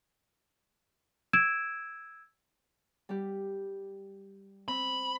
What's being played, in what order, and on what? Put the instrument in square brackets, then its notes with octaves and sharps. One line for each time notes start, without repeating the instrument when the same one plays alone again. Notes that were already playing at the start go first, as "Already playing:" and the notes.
[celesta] E6 G#6 D7 E7
[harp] G3 G4
[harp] C4 [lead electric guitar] B5